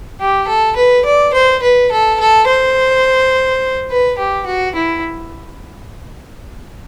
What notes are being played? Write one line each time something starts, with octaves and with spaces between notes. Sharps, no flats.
G4
A4
B4
D5
C5
B4
A4
A4
C5
B4
G4
F#4
E4